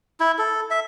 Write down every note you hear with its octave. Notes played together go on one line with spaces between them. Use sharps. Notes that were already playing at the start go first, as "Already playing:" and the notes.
E4
A4
E5